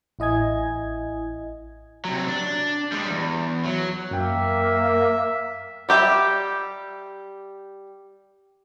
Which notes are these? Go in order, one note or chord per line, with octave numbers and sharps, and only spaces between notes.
A1 E4 D#5 G#5 G#6
C3 F#3
D4
G3 G#3
E2
F#3
F#2 A#3 A#4 E5 G5
G3 G4 E5